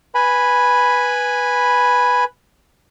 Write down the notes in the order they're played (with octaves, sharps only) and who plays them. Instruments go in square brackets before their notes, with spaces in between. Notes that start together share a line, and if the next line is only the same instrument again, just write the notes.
[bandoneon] B4 G#5 B5